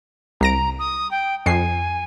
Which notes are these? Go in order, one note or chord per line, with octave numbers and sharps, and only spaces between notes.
C2 A#5 A#6 D7
D#6
G5
F2 G#5 C7